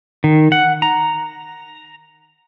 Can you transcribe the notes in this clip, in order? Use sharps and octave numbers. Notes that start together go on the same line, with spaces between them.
D#3
F#5
A#5